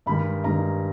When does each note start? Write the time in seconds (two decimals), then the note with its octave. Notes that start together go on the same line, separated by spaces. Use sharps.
0.06 G2 D#3 G#3 B5
0.44 G2 D#3 G#3 A#5